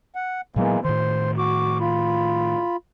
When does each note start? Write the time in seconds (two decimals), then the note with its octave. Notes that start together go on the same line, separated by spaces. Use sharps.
0.15 F#5
0.56 A#2 E3 F#3 G#3 A#3 B3
0.85 A2 D#3 C5 C6
1.38 F#4 D6
1.81 F4 B5